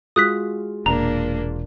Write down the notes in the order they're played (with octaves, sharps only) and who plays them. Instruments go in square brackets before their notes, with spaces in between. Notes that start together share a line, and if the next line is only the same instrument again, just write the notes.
[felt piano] G#3 F4 F#4 [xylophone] D#6 F#6 B6
[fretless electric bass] E1 [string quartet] A#2 A#3 D4 [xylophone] A#5